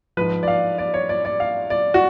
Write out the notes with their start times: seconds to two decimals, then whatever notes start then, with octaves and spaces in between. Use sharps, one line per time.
0.17 G#2 F3 B4
0.43 D5
0.48 F5
0.78 D5
0.94 C#5
1.09 D5
1.25 D5
1.40 F5
1.70 D5
1.94 F#4